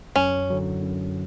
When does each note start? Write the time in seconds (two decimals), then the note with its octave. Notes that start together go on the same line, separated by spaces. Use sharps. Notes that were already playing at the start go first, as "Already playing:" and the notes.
0.16 F#2 C#4
0.50 D3 F#3
0.84 F#2